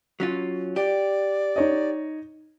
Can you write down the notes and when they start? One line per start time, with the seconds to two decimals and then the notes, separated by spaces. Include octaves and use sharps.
0.20 F#3 C#4 F4
0.76 G4 D5
1.56 D#4 C#5 D#5